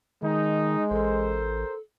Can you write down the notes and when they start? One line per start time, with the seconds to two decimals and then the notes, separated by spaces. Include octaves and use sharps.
0.22 D#3 G#3 D#4
0.91 A1 A4 A#4 C5